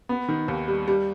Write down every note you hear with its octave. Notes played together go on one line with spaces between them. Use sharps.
B3
D#3
D#2
G3
G3